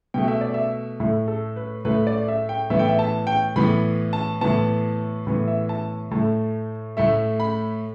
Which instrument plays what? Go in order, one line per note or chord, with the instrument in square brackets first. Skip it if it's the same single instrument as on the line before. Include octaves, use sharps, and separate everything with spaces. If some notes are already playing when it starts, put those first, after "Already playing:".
[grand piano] B2 A3 G5
E5
D5
E5
A2 A3
A4
B4
A2 A3 B4
D5
E5
G5
A2 E3 B3 E5
G5
E5
A5
G5
A2 E3 B3 B5
A5
A2 E3 B3 A5
A2 E3 B3
E5
A5
A2 A3 A5
A2 A3 E5
B5